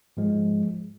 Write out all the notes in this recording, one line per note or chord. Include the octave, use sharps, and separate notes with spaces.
G#2 F3 G#3